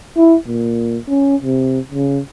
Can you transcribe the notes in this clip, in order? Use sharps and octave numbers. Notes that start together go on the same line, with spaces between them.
E4
A#2
C#4
C3
C#3